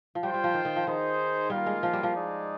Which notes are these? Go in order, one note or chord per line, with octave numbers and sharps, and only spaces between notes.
F3
G3 F4 C5 G5
G3
F3
D#3
D#3
F3
D#3 D#4 G#4 C5
G3 A#3 F4 A#4 F5
G#3
F3
G3
F3
G#3 D#4 G#4 D5